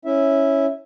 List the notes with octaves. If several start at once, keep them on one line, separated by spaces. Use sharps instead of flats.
C#4 E4 E5